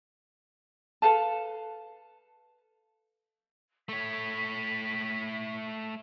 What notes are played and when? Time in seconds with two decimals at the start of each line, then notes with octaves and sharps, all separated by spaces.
1.02 A4 B4 F5 A5
3.89 A3 C#5 B6